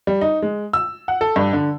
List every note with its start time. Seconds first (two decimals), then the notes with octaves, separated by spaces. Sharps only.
0.07 G3
0.21 D#4
0.42 G#3
0.73 E6
1.08 F#5
1.21 A4
1.36 G2
1.53 D3